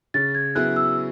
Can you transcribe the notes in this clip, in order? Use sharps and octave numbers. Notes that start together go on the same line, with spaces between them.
C#3 A6
G#6
F#3 B3 E4 G#4 F#6
E6